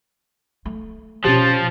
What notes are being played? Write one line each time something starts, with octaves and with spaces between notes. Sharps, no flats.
A3
B2 F3 C#4 G4 A5